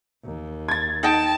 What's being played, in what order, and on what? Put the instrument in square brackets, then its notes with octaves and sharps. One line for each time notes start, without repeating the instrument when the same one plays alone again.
[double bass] D#2
[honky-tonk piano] G#6 A6
[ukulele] D#4 D#5 G5 [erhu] A5